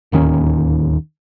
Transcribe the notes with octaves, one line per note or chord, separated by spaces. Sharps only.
D1 D#2 D#3 C#4